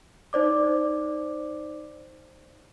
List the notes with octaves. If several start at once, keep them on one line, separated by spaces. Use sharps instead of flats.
D#4 C5 D5 D6